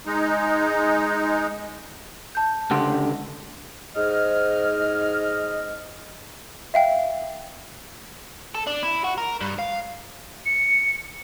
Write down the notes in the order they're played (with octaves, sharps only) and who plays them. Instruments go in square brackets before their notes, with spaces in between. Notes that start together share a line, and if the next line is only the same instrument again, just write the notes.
[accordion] G#3 D#4
[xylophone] A5 G6
[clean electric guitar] C#2 D3 G4 [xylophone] F#5 C6
[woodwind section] G#2 F6 [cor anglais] D#5
[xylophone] E5 F5 G5
[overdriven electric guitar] A4
D4
E4
F#4
A#4
G2
F5
[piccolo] C#7